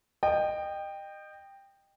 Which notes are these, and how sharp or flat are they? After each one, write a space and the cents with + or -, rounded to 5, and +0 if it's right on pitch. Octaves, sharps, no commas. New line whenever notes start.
D#5 -25 G5 +10